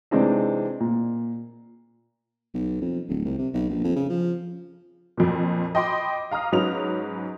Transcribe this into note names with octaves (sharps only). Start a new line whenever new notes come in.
C3 E3 G#3 C4 D4 D#4
A#2
B1
F2
D1
C2
C3
B1
A#1
F2
C#3
F3
F2 A#2
D#5 G5 B5 C6 D6
F5 A#5 D#6 F6
G#2 F#3 C#4 B4 F7